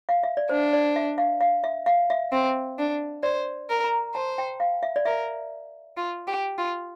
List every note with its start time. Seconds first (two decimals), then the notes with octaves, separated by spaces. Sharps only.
0.09 F5
0.23 E5
0.37 D5
0.49 D4 C5
0.73 D5
0.96 E5
1.18 F5
1.41 F5
1.64 E5
1.86 F5
2.10 E5
2.32 C4
2.78 D4
3.23 C5 D5
3.70 A#4
3.84 A#5
4.15 C5 A5
4.38 G5
4.60 F5
4.83 E5
4.96 D5
5.05 A#4 E5
5.97 F4
6.28 G4
6.58 F4